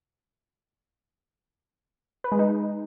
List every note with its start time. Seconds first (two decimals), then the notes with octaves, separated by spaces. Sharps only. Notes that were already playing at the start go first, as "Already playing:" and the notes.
2.24 B4
2.32 G#3
2.39 D#4